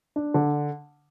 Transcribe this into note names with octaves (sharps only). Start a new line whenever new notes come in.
D4
D3